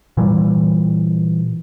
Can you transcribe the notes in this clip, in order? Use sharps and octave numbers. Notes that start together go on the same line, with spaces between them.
A#2 E3 G3